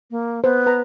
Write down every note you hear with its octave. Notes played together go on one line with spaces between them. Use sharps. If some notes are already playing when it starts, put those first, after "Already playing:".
A#3
B3 C5
B4 A#5 B5